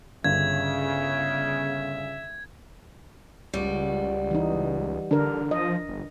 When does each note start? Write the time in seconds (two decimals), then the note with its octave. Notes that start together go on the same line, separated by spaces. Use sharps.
0.24 G1 C#3 E5 G#6
3.54 C#2 G3 F#4
4.31 E3 D#4
5.11 D3 D4 A#4
5.51 F3 D#5
5.89 G1